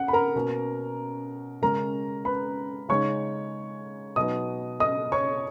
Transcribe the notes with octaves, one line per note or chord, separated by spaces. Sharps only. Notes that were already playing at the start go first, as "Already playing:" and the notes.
Already playing: C#4 F#5
B5
A#4 A#5
B2 A#3 C#4
C#3 G#3 C#4 A#4 A#5
B4 B5
C#3 G#3 D#4 C#5 C#6
B2 F#3 B3 D#4 D#5 D#6
D#5 D#6
C#5 C#6